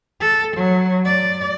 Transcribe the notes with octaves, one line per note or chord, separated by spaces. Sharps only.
A4
F#3
D5